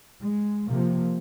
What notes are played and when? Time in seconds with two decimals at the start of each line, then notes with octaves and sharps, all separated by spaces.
0.21 G#3
0.68 C3 F3 A#3